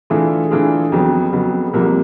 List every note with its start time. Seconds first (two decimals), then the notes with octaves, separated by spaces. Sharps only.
0.10 E3 A3 D4 F4 G#4
0.51 E3 A3 D4 F4 G#4
0.92 F2 C#3 F#3 B3
1.33 F2 C#3 F#3 B3
1.73 C2 C3 F3 A#3